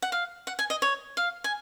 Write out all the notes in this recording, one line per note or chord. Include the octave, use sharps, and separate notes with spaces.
F#5
F5
F#5
G#5
D#5
C#5
F5
G#5